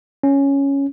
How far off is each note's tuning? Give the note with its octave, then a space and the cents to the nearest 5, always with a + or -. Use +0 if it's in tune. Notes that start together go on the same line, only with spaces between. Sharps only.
C#4 +0